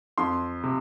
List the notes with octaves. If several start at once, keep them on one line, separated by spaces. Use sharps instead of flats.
F2 C6
C3